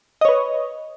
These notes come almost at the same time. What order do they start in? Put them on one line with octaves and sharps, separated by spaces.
D#5 C#5 B4